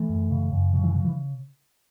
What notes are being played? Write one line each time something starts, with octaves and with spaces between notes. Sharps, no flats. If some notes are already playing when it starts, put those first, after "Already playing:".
Already playing: E3 A3
F#2
C#3
F#2
C#3 F#3
E3
C#3 F#3
E3